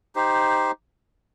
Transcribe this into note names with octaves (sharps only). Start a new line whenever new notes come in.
D#4 G4 C5